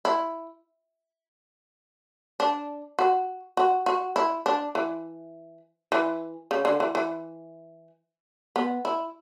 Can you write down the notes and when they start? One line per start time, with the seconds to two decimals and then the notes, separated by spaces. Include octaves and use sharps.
0.05 E4
2.40 D4
2.99 F#4
3.57 F#4
3.86 F#4
4.16 E4
4.46 D4
4.75 E3
5.92 E3
6.51 C#3
6.65 D3
6.80 E3
6.95 E3
8.56 B3
8.85 E4